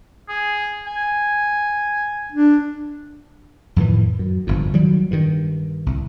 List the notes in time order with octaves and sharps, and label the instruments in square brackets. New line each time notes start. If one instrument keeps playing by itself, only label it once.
[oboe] G#4
G#5
[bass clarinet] D4
[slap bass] F2 A2 D#3 E3
F#2
G1 F2
D#3 F#3 G3
G2 D#3
C2